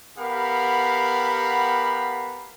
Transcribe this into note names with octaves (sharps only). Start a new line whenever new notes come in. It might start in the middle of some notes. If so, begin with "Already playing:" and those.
B3 G4 A#4 F5 F#5 B5